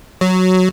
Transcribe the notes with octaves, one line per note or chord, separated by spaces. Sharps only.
F#3